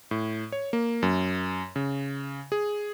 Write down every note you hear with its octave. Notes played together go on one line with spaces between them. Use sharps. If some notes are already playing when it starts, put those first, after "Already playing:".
A2
C#5
A#3
F#2
C#3
G#4